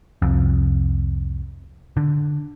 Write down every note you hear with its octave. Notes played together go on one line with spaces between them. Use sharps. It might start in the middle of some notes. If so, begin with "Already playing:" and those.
C2 F2
D3